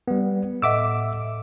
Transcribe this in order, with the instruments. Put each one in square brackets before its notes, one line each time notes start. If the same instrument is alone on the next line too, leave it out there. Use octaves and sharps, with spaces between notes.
[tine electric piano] G3 B3
[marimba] A2 D#5 F#5 [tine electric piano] E5 D6 E6